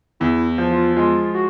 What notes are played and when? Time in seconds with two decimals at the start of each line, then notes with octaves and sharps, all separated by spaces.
0.20 E2 E4
0.58 F3
0.71 F4
0.96 G#3 F4
1.35 F#4